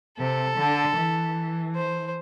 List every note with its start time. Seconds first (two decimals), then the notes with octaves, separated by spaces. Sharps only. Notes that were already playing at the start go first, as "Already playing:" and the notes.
0.18 C3 A4
0.57 D3
0.96 E3
1.75 C5